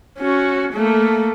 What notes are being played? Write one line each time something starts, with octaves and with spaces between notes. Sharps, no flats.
C#4 F#4
A3 A#3